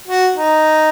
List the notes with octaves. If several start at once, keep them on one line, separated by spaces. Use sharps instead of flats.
F#4
D#4